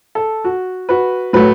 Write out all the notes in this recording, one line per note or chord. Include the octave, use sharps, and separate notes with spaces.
A4
F#4
F#4 B4
A2 F#3 A3 F#4 B4